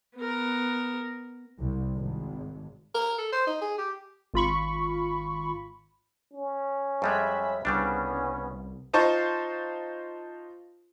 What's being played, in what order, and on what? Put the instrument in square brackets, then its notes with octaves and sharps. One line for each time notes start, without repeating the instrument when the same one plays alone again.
[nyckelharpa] B3 A#4
[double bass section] C2
G#1
[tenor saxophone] A#4
A4
C5
D#4
G#4
G4
[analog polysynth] G#1 F4 B5 C#6
[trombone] C#4
[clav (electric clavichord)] F2 G3 G#3 [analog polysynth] E5 B5 B6
[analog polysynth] C2 [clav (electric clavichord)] C#3 G3 D4 [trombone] B3 [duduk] C#4
[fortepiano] D#4 F4 C5 A5 C#6